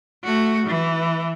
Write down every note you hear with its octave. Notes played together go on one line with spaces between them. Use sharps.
A3 F#4
E3